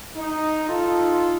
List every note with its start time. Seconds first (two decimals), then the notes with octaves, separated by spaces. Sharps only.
0.17 D#4
0.69 D#4 F4 A4